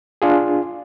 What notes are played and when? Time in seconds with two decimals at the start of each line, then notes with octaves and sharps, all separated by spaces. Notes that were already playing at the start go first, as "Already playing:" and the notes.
0.22 D4 F4 G#4